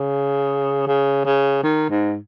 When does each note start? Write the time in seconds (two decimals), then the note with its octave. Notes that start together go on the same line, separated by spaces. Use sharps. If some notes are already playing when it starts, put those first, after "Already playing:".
Already playing: C#3
0.87 C#3
1.25 C#3
1.63 D#3
1.90 G#2